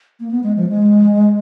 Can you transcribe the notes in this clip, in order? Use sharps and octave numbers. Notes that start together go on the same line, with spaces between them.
A#3
B3
G#3
F3
G#3